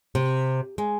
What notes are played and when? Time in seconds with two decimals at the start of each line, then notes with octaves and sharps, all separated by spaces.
0.15 C3
0.78 G#3